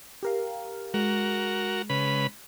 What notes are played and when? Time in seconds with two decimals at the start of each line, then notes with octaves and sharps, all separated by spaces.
0.23 G4 A#4 F5
0.94 G#3 F#4 A#4
1.89 C#3 B4 B5